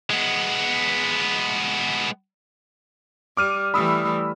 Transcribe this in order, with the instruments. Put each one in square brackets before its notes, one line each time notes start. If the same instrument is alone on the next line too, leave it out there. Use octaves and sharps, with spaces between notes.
[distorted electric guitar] G#3 B3
[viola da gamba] G3 [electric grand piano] D6 F6 D#7
[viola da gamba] E3 G3 A3 [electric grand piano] B5 D#6 E6